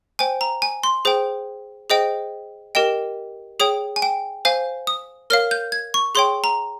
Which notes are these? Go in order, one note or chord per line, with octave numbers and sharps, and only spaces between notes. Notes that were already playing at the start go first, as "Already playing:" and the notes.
C5 G5 G#5
A#5
G#5
C6
G#4 C5 G5
G#4 C5 D#5 G5
G4 A#4 D#5 G5
G#4 C#5 G5 D#6
G#5
G5
C5 F5 G#5
D#6
A#4 C#5 F5 F6
G6
G#6
C#6
G#4 C#5 G5 C6
A#5